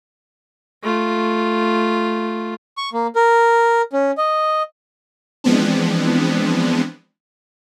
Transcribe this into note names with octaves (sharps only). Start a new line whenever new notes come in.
A3 F4
C#6
A#3
A#4
C#4
D#5
E3 F3 G#3 B3 C4 D4